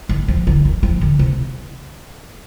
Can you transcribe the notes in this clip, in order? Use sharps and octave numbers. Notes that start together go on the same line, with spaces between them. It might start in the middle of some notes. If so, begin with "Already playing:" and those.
D#3
F3
D3
D#3
F3
D3
C3